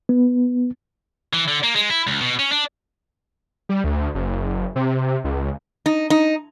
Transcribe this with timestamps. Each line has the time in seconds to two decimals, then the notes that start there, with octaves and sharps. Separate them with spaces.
0.09 B3
1.33 E3
1.48 D3
1.64 A#3
1.76 G#3
1.90 E4
2.07 C#2
2.21 B2
2.39 C#4
2.52 D4
3.69 G3
3.84 D2
4.15 F#1
4.76 C3
5.24 C#2
5.86 D#4
6.10 D#4